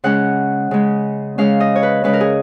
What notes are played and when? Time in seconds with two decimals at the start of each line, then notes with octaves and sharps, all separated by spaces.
0.04 C#3 G#3 C#4 F#5
0.71 C#3 G#3 C#4
1.38 C#3 G#3 C#4 F5
1.60 D#5
1.76 C#5
1.83 B4
2.04 C#3 G#3 C#4 B4
2.13 A#4
2.21 G#4